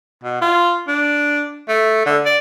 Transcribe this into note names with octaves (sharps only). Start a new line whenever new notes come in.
B2
F4
D4
A3
D3
D5